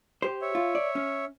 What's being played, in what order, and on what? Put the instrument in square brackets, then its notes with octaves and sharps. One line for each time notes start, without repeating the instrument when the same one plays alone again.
[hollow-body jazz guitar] G4 C5
[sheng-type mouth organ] C#5 E5
[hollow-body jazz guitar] F4
D5
C#4